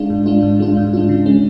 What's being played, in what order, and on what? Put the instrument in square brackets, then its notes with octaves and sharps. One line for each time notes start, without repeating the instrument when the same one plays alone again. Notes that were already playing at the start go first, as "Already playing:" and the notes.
Already playing: [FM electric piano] G#3 D4 F4
G#2
G#3 D4 F4
G#2
G#3 D4 F4
G#2
G#3 D4 F4
C#3
G#3 C#4